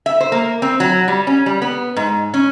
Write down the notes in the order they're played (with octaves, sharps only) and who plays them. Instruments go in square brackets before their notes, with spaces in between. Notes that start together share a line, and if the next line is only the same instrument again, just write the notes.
[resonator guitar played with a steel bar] E5
C5
A#3
C4
F#3
G3
C#4
G3
B3
G#2
C#4